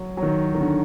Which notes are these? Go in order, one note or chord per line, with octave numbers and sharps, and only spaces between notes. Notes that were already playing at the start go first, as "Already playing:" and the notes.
Already playing: F#3
F#3
D#3
D#3
D3